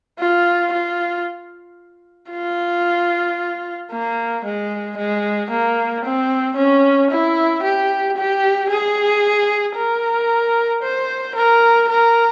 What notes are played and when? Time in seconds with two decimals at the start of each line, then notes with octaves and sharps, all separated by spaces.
0.20 F4
0.72 F4
2.32 F4
3.92 A#3
4.44 G#3
4.97 G#3
5.50 A#3
6.05 C4
6.57 C#4
7.11 E4
7.63 G4
8.17 G4
8.70 G#4
9.76 A#4
10.82 C5
11.35 A#4
11.89 A#4